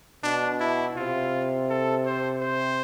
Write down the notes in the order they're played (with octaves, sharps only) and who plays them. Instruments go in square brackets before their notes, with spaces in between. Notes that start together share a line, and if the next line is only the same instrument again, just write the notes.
[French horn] B2 [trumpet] D4
[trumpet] E4
[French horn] C3 [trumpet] F4
[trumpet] A4
C5
C5